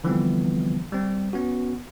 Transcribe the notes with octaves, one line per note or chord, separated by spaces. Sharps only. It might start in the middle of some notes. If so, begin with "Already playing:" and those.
D3 E3 F3 G3 B3 C4
G3 C4
B3 C#4 F#4